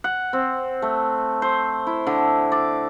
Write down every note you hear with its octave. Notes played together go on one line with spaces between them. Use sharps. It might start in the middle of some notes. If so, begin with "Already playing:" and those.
F#5
C4
A3
C5
E4
D3
D5